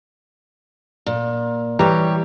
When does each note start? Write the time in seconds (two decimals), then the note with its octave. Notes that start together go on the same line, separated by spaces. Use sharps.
1.06 A#2
1.79 E3 G3 G4 C#5 A#5